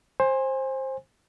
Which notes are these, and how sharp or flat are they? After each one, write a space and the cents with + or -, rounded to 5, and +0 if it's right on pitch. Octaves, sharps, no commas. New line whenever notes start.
C5 +15 G#5 -20